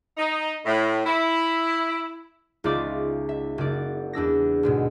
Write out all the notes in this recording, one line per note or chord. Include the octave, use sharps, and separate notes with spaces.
D#4
A2
E4
C#2 D#4 F4 D5 E5 D6
E5
F#1 D5
E2 D4 E6 A#6
D2 G#2 B2